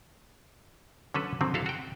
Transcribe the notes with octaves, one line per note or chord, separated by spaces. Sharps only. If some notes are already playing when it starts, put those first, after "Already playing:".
D3 F#3 C#4 A4 B4
D3 D#3 F3 F#3 C4
E4 F#4 G#4 A4 F5
F#4 G5